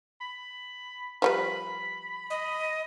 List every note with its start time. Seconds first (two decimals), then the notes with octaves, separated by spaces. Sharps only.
0.21 B5
1.22 F3 G3 B4 B5
2.30 D#5